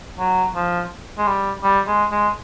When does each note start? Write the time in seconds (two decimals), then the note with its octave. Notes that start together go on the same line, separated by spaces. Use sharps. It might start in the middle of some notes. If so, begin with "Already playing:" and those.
0.19 F#3
0.55 F3
1.18 G#3
1.27 G3
1.64 G3
1.88 G#3
2.11 G#3